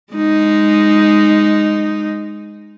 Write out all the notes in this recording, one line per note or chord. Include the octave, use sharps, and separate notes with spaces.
G#3 D#4